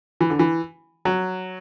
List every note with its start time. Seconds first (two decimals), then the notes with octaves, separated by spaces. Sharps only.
0.21 E3
0.30 D3
0.39 E3
1.05 F#3